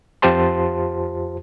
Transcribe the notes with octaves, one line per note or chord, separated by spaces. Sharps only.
F2 F4 G4 C5 A5 C6